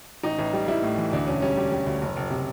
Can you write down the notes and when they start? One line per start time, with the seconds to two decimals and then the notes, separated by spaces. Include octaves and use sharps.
0.23 A1 D#4
0.39 A1
0.53 G3
0.68 G3 E4
0.83 A2
0.98 E3
1.13 D2 D4
1.27 E1 C#4
1.42 G3 C#4
1.57 G3
1.71 G3
1.87 D2
2.02 F#1
2.17 F#1
2.30 C3